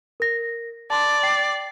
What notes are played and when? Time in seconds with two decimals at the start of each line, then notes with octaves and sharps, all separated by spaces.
0.20 A#4 A#6
0.90 D5 A5 C6
1.23 G5 C7